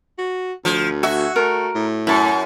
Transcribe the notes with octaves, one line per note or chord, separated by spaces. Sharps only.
F#4
D2 F3
F#4 E5 G#5
A3 A#4
A2
F#2 E4 A5